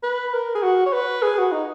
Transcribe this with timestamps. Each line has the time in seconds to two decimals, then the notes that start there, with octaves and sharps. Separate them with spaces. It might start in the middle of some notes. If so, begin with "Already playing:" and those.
0.03 B4
0.34 A#4
0.55 G#4
0.62 F#4
0.86 C#5
0.93 B4
1.22 G#4
1.38 F#4
1.52 D#4